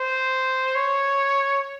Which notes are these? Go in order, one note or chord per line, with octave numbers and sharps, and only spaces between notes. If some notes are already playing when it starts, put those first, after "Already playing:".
Already playing: C5
C#5